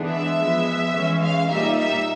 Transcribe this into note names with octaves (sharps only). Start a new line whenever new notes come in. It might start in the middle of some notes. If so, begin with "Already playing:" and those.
Already playing: E3 G#3 B3 D4
E5
F3 G#3 B3
E3 G#3 C#4
F5
A#2 G3 A#3 D#4 E5
E5